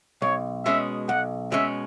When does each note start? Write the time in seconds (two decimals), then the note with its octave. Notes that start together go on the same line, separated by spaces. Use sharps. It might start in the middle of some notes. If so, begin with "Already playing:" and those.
0.22 B1 C#5
0.65 B2 G#3 C#4 E5
1.09 B1 F#5
1.52 B2 G#3 C#4 E5